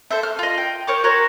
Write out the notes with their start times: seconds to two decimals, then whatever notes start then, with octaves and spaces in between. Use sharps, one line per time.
0.11 A4 C5 E5
0.23 F6
0.39 F4 D#5
0.58 G5
0.87 A#4 C5 C#5 D6
1.04 F#4 A#4 C5 C#5